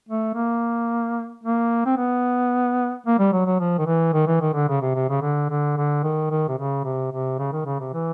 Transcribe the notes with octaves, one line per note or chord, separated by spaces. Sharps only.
A3
A#3
A#3
C4
B3
A#3
G3
F#3
F#3
F3
D#3
E3
D#3
E3
D#3
D3
C#3
C3
C3
C#3
D3
D3
D3
D#3
D#3
C3
C#3
C3
C3
C#3
D#3
C#3
C3
E3